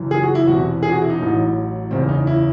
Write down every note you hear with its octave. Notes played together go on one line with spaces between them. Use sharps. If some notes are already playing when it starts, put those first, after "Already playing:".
Already playing: F#1 F#2 E3
G#4
F#4
E4
E1 E2 C3 F#4
G#4
F#4
E4
D#4
A1 A2 F#3
F#1 E2 C#3 C4
D#4
E4